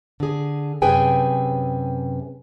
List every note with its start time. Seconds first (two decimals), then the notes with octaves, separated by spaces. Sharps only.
0.20 D3 G#4
0.82 F#2 C3 G#4 B4 G5 G#5